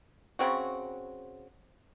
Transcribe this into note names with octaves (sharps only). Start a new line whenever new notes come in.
C#3 C4 F#4